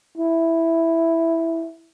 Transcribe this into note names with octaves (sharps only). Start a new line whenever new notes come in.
E4